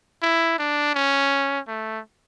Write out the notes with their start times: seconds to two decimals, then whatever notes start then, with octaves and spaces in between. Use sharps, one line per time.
0.22 E4
0.59 D4
0.95 C#4
1.68 A3